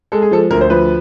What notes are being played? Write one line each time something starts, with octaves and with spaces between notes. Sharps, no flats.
G#3 A4
G#4
F3 A4
D2 A#4
C5
F3 B4